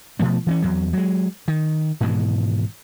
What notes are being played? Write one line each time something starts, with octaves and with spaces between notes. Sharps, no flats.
B2 F3 A3 B3
E3 C4 C#4
E2 F#3
F#3 G#3
D#3
G#2 B2 D#3 E3